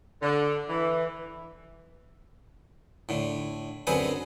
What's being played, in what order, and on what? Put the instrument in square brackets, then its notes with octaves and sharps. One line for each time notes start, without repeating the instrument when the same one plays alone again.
[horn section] D3
E3
[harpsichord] A2 D3
F#2 D3 C4 G#4 B4 F#5